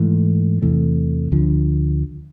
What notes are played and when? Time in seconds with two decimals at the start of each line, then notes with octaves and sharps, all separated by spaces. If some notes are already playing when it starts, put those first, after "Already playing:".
Already playing: G#2 E3 A3
0.62 E2 C3 E3 A3
1.32 D2 D3 F3